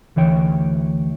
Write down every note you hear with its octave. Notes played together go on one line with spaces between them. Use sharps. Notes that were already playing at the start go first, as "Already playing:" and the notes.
D2 E3 C#5 G5